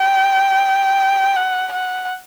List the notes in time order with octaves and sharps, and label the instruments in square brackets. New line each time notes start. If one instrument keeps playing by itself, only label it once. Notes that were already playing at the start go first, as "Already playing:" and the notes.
Already playing: [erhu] G5
F#5
F#5